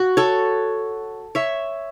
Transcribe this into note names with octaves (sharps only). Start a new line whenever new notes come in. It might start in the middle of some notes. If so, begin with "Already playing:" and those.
Already playing: F#4
A4 C#5
C#5 E5